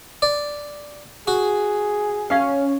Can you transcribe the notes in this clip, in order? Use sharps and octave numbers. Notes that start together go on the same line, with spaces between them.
D5
F#4 G#4
C#4 F5